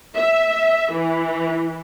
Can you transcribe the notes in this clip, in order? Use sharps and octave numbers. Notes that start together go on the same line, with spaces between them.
E5
E3